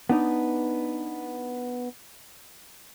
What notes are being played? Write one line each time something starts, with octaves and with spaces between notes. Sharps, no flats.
B3 D4 D#4